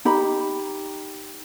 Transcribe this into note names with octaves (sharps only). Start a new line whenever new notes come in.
D#4 G4 B5